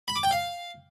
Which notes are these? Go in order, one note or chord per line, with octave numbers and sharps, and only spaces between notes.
B5
D6
G5
F5